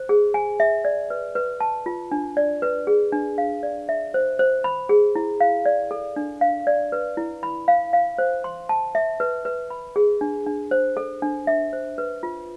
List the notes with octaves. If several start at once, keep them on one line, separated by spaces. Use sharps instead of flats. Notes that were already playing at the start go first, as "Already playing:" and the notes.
Already playing: C5
G#4
G#5
E5
D5
B4
B4
A5
F4
D4
D5
B4
G#4
D4
F5
D5
E5
C5
C5
B5
G#4
E4
F5
D5
A4
D4
F5
D5
B4
E4
B5
F5
F5
C5
C6
A5
E5
B4
B4
B5
G#4
D4
D4
C5
A4
D4
E5
C5
B4
F4